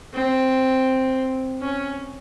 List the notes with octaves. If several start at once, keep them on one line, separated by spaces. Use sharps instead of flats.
C4
C#4